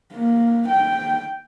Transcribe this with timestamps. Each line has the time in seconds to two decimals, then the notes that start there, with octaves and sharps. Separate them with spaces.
0.14 A#3
0.69 G5